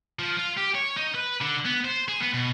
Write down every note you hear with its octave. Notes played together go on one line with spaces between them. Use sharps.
F3
F4
G4
C#5
D#4
B4
D3
B3
C5
G#4
B3
B2